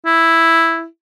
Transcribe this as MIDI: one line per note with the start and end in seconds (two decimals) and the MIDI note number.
0.06 0.85 64